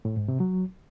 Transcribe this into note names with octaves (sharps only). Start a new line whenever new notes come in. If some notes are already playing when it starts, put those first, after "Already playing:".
A2
G#2
C3
F#3